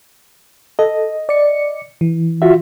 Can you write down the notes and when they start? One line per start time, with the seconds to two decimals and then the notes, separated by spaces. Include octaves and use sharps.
0.79 A4 D#5
1.29 D5 C#7
2.01 E3
2.42 F4 F#4 E5